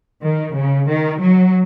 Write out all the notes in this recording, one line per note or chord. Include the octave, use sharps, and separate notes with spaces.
D#3
C#3
D#3
F#3